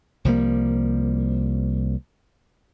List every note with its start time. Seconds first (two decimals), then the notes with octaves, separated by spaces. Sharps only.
0.25 C2 F3 G3 A#3